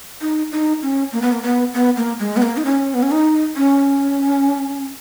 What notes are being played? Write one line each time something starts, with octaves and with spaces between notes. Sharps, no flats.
D#4
D#4
C#4
A#3
B3
A#3
B3
B3
A#3
G#3
B3
A#3
D#4
C#4
B3
C#4
D#4
C#4